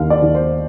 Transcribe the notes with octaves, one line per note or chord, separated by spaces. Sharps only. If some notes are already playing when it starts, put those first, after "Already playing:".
Already playing: D#2 F5
D5
D#2
C5